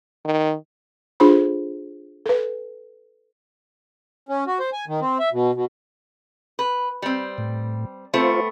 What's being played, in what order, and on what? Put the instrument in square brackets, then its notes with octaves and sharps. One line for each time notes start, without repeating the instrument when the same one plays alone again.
[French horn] D#3
[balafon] D4 F4 G#4 A4 C5 B5
A4 B4
[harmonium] C#4
F#4
C5
G#5
D#3
C4
E5
B2
B2
[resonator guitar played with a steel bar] B4
G3 C4
[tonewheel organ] A2
[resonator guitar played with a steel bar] A3 B3 C4 [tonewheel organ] F4 C5